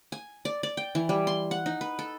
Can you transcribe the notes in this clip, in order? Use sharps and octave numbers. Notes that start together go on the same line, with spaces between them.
G#5
D5
D5
G5
E3
G3
C6
F#5
D#4
B4
A4